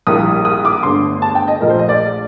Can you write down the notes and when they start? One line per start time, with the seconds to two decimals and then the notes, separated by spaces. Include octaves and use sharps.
0.07 A#1 A2 G3 A#3 D#6
0.45 D#6
0.65 D6
0.83 G1 G2 D3 A3 C6
1.22 A5
1.35 G5
1.48 D#5
1.60 A#1 A#2 A3 A#4
1.70 C5
1.79 D#5
1.89 D5